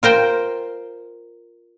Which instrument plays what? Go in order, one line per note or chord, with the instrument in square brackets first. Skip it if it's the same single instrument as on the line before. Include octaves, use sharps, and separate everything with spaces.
[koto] F4 A#4 C5 G5